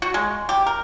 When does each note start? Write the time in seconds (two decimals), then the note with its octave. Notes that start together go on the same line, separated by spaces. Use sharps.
0.02 F#4
0.14 G#3
0.49 G4
0.66 A#4